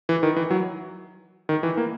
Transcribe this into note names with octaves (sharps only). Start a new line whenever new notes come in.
E3
D#3
E3
F#3
D#3
E3
A#3